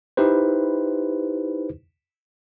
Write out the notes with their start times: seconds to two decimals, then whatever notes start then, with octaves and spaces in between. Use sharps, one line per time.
0.17 D#4 E4 G4 B4 C5